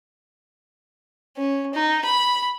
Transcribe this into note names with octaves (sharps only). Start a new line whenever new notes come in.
C#4
D#4
B5